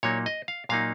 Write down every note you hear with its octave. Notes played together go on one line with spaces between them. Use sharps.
A#2 F#3 A#3 D#4 C#5
D#5
F5
A#2 F#3 A#3 D#4 F5